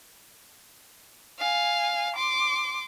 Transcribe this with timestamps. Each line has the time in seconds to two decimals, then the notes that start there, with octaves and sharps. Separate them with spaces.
1.39 F5 G#5
2.16 C6 D6